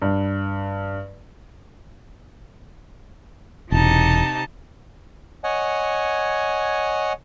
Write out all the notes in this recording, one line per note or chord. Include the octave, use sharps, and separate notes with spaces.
G2
E1 C3 D#4 A5
C#5 D#5 F#5 G#5